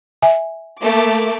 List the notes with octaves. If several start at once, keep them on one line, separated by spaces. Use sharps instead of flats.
E5 G#5
A3 A#3 D6